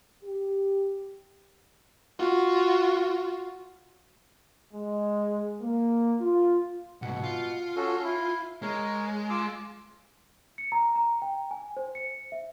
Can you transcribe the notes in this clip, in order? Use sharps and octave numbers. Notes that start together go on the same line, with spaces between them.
G4
F4 F#4
G#3
A#3
F4
C2 G#2 B2 F#5
F4
C#4 F#4 A4
E4
G#3 A#4 C#5
F4 D6 E6
C#7
A#5
A#5
G5
G#5
C5
C#7
E5